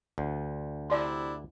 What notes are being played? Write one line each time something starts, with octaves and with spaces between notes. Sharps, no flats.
D2
C3 D4 E4 D5 C6